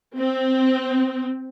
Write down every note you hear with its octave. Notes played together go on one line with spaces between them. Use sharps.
C4